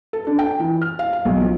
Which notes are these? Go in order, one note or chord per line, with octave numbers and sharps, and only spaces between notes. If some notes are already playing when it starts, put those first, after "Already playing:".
A4
D4
G5
E3
F6
F5
F5
B1
F3